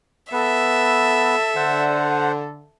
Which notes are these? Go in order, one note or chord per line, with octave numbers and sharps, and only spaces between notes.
B3 A4 B4 E5
D3 C5 F#5